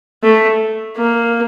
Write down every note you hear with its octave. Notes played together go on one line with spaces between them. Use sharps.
A3
A#3